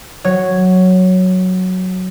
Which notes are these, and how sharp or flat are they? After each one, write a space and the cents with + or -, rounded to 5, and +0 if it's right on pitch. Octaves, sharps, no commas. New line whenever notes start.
F#3 +0 C#5 +0